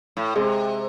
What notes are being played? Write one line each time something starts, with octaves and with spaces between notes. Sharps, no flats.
A2
C3 G#3